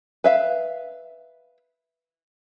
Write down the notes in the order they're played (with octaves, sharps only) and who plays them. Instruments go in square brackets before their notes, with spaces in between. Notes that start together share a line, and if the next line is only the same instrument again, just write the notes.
[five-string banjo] B4 E5 F5